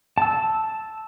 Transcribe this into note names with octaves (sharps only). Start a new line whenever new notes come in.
A5 E6